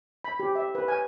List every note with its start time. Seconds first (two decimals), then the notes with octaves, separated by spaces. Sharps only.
0.24 B5
0.40 G4
0.55 E5
0.75 B4
0.88 G#5